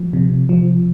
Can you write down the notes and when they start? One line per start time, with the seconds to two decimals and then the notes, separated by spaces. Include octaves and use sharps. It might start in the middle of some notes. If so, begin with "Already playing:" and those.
Already playing: F3
0.13 C3
0.49 F3